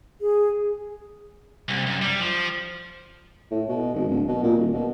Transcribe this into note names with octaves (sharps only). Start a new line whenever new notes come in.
G#4
C2
F#2
G3
F3
A2
B2
G#1
D1
B2
A#2
D#1
B2